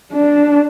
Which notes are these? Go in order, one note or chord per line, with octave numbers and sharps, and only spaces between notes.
D4